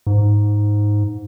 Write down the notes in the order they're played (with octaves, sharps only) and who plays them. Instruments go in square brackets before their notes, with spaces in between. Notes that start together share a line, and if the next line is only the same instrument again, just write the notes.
[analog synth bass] G#2